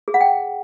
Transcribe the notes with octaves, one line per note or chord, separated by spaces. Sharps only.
G#4
F#5
G5